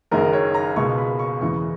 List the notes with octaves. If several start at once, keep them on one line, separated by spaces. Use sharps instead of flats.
F#1 F#2 D#3 G#3 A#4
C#5
A#5
C#2 B2 G#3 C#6
B5
C#6
E2 C#3 E3 G#3 C#6